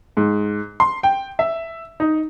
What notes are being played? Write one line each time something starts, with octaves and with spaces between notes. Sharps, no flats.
G#2
C6
G5
E5
D#4